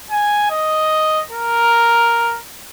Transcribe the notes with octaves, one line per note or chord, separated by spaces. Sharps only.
G#5
D#5
A#4